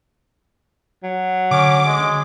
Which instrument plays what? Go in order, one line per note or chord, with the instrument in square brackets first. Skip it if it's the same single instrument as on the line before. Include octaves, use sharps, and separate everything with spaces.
[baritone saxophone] F#3
[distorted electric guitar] D2 [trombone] C#4 [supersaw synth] D6
[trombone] G#3